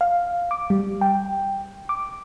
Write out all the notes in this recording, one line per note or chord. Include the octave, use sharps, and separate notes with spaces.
F5
D6
G3
G5
D6